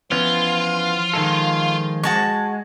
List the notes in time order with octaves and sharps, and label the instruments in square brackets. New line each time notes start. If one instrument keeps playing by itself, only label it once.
[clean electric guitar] E3 B3 C#4 [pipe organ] F3 [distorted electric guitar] F4
[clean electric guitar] D#3 G#3 A4
[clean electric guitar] G#3 [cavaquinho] F#4 A5 C#6